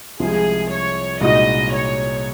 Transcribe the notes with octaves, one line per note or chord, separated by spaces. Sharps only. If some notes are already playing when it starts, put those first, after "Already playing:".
C2 C3 F3 G#3 G#4
C#5
C2 A#2 G#3 D#4 F#4 D#5
C#5